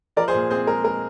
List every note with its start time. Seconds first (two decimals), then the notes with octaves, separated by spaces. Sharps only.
0.16 F3 A#4 D5
0.28 G#4 C5
0.34 A#2
0.50 C4 G#4 C5
0.67 G#3 A#4
0.84 G#3 A#4